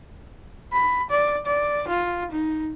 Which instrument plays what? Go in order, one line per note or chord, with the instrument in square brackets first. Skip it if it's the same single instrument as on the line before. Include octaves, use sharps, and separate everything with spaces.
[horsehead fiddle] B5
D5
D5
F4
D#4